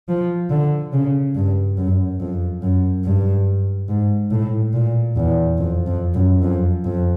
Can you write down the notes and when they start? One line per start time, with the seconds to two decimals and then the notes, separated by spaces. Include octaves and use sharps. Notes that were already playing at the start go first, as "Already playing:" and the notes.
0.08 F3
0.50 D3
0.93 C#3
1.35 G2
1.77 F#2
2.20 F2
2.62 F#2
3.04 G2
3.89 G#2
4.31 A2
4.73 A#2
5.16 E2
5.58 F2
5.86 F2
6.14 F#2
6.42 F2
6.84 F2